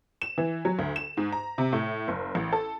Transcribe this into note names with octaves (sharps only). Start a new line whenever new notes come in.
E7
E3
F#3
D2
E7
G#2
A#5
C3
A2
F#1
A1
A4